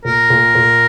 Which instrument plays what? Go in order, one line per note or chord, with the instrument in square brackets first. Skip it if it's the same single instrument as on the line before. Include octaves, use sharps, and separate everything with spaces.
[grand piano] A#2 [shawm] A#4
[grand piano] A#2
A#2